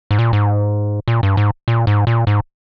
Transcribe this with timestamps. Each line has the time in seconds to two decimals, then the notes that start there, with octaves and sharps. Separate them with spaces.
0.11 G#2
0.19 A#2
0.33 G#2
1.08 A#2
1.23 G2
1.37 G#2
1.68 A#2
1.87 G#2
2.07 A#2
2.27 G#2